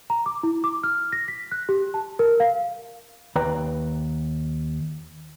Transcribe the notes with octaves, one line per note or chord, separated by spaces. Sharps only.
A#5
D6
E4
D6
F6
A#6
B6
F#6
G4
A5
A#4
F5
D#2 B4 D5 G5 A#5